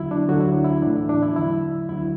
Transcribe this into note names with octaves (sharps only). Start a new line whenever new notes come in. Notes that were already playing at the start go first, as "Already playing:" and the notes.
Already playing: E2 D3 F#3 E4 F#4
D4
D2 D3 F#3 F#4
E4
D4
E4
A2 E3 D4
E4
D4
E4
E2 D3 F#3 E4
D2 D3 F#3 E4